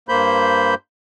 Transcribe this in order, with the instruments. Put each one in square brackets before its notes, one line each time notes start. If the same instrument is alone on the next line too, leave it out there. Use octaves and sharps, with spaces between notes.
[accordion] G2 A#3 C5 B5 G6